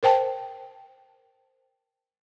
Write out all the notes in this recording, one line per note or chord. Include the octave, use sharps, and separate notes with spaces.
A#4 C5 G5 A5